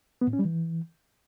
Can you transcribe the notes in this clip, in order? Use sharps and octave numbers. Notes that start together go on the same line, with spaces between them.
B3
A2
C#4
G3
E3